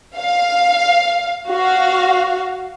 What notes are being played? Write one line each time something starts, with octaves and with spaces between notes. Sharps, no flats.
F5
F#4 F5